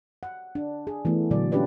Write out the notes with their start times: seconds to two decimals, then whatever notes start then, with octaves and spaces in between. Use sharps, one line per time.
0.23 F#5
0.55 D4
0.87 G#4
1.05 E3 A3 B3
1.31 A#2 D3 F#3 D5
1.52 C#4 D4 F4 G4 B4 D5